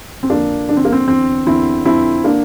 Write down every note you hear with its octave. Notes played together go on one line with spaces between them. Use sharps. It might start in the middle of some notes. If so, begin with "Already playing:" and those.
C4
F2 D3 A#3 D4
F2 D3 D4
C4
A#3
C4
E2 D3 C4
E2 D3 C4 E4
F2 D3 C4 E4
D3 A#3 D4